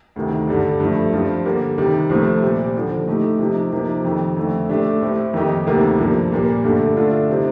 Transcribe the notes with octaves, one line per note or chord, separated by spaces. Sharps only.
D2 C3 D#3
G2 D3 G3
G2 F3 A3
G2 F3 C4 F4
D3 G3 A#3
C3 D#3 G3
C2 C3 F3 A3 C4
A#2 G3 C4
D#2 D3 F3
A2 A3 D#4 G4
C3 F3 C4 D#4 G4
C3 F3 A#3 D#4 G4
F2 D#3 G3
F2 D3 A3
A2 A3 D4 G4
A2 A3 C4 G4
F2 D#3 A#3 D#4 G4
D2 C3 D#3 G3 A#3
G2 F3 A#3
A#2 G3 A#3
G2 D3 A3 D4 G4
D3 A3 D4 F4
C3 G3 C4 D#4